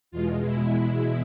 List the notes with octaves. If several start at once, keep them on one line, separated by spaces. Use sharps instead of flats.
E2 B2 G#3 F4
E4
E4